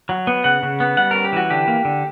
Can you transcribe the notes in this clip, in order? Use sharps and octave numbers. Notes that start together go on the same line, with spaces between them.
F#3
B3
C#3 F#5
C#3
B3
G3 F#5
C#4 A#4
G4
E3 F#4
D3 G4
A#3
D3